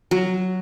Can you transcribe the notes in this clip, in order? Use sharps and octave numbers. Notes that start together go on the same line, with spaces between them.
F#3